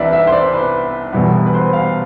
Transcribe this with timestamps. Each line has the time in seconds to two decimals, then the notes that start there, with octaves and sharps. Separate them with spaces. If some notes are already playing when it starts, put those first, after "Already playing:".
Already playing: C2 C3 E3 B3 D4 D5 E5
0.13 E5
0.27 C5
0.32 D5
0.53 B4
1.13 E1 E2 B2 G3 B3
1.46 B4
1.54 C5
1.73 F5